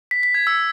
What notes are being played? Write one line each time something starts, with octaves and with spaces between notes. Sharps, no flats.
B6
B6
G#6
E6